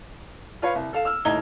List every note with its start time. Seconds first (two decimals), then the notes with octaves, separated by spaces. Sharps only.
0.62 F4 B4 C#5 F5
0.75 C2
0.93 A4 F5 E7
1.05 E6 F6
1.25 D#1 A2 D#4 A#5 G#6 G7